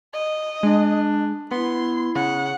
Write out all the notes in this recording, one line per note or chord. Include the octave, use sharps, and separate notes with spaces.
D#5
G#3 D4
B3 E4 C6
C#3 F#5